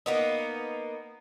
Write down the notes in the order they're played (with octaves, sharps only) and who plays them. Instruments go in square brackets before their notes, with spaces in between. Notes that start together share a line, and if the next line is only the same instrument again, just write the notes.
[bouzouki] A#3 B3 D#4